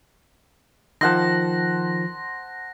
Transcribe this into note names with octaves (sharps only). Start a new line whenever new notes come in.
D#3 F3 C5 F#5 A5 A#6